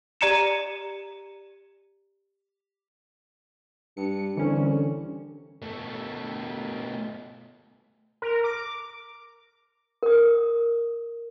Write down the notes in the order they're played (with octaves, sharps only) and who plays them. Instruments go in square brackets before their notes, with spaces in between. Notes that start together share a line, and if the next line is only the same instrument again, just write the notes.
[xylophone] G4 D5 A#5 C#7 E7
[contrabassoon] G2 [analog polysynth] C#7
[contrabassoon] C2 [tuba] D3 [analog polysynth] E3 C#4
[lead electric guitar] B2 A3
[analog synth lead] A#4
D6
[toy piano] A#4 D#6